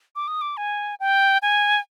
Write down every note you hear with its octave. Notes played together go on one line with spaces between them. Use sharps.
D6
D#6
D6
G#5
G5
G#5